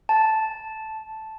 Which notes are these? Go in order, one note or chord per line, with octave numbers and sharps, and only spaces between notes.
A5